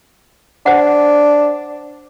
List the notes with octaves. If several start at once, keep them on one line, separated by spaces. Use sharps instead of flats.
D4 C5 F#5